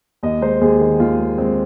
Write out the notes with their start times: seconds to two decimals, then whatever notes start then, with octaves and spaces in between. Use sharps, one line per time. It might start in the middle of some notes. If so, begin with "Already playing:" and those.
0.23 D#2 D#5
0.41 G#3 C5
0.61 D#2 G#4
0.80 D#3
1.00 D#2 F4
1.19 G#3
1.38 G#3 C4